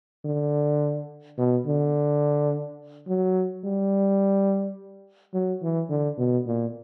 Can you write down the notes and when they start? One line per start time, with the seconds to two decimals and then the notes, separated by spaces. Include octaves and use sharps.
0.25 D3
1.38 B2
1.66 D3
3.08 F#3
3.64 G3
5.34 F#3
5.62 E3
5.90 D3
6.18 B2
6.47 A#2